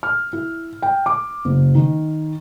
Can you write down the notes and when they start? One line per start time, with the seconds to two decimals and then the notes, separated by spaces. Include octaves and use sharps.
0.03 F6
0.33 E4
0.82 G5
1.06 D6
1.45 F#1
1.75 D#3